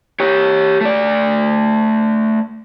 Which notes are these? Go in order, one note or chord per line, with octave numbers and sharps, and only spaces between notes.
G4 C#5
A3 D5